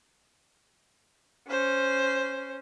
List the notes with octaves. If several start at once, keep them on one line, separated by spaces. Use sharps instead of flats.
C#4 C5